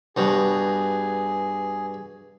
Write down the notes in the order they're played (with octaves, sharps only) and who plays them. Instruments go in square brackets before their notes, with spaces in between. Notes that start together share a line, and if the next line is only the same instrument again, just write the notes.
[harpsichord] G2 B2 [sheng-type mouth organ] G#4